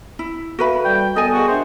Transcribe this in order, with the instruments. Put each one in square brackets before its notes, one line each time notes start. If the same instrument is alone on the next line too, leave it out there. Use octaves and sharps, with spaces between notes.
[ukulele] E4
[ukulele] F#4 B4 B5 [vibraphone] A4 E5 F5
[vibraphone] G3 D5 [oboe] G5
[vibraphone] B3 [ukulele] A4 G#5 [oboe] D#5
[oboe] F#4 [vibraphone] G#4 A#4 D#5
[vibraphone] D4 E5 G5 [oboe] C5